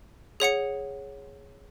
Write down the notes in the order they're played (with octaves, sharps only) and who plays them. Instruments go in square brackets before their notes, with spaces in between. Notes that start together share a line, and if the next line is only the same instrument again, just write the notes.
[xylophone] G#4 C#5 F#5 C#7